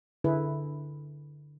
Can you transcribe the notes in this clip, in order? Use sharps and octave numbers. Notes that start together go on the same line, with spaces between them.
D3 E4 G#4 B4